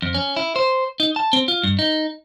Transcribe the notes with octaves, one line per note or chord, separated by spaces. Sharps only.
F2
C#4
E4
C5
D#4
A5
C4
F4
G2
D#4